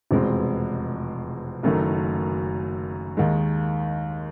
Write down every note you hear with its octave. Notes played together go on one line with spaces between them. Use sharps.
F1 E2 B2 G#3 C4
F#1 F#2 D#3 F#3 A3
D#2 D#3 G#3